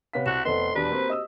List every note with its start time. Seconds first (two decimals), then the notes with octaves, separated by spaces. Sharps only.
0.13 C3 B3 C#5 F5 B6
0.26 C2 F#4 F#6 E7
0.45 F1 B3 A4 C5 D#5 C6
0.75 E1 D4 F#4 G4 B4
0.89 A#3 C4 C5
1.09 D#5 D#6 E6